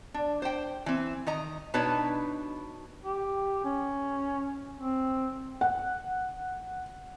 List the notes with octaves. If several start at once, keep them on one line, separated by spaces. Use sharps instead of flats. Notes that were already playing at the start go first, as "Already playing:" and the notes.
D4
C5 G5
E3 C4
D#3 D#5 A#5
B2 D4 D#4 B4 C#5 A5
G4
C#4
C4
F#5